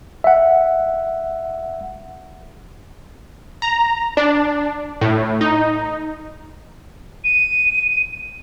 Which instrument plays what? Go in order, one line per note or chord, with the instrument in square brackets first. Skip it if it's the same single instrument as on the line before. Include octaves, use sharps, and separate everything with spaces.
[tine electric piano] E5 F#5
[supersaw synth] A#5
D4
A2
D#4
[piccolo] D#7